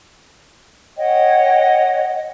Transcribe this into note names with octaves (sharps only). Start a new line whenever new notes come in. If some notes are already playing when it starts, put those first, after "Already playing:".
C#5 D#5 F#5 G5